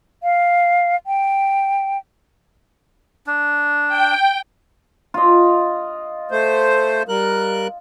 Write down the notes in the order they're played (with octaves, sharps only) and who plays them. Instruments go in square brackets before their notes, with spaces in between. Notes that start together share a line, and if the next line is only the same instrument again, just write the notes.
[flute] F5
G5
[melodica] D4
[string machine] G5
[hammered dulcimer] F4 D#5
[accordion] A3 C5
G3 A#4 F#6